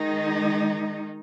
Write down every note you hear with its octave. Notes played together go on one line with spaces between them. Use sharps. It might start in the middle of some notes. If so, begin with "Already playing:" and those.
Already playing: D#3 G#3 D#4